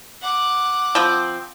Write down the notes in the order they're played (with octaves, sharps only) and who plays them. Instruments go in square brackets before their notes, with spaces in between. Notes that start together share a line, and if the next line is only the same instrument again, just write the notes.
[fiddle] F#5 D6
[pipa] F3 C4